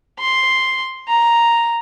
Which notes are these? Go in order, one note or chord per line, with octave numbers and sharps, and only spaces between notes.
C6
A#5